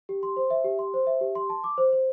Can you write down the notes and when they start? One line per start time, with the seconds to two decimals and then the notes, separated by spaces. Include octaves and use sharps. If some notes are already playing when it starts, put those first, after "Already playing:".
0.09 G4
0.23 C6
0.37 C5
0.50 E5
0.64 G4
0.79 C6
0.94 C5
1.07 E5
1.21 G4
1.35 C6
1.50 A5
1.64 D6
1.78 C5
1.92 C5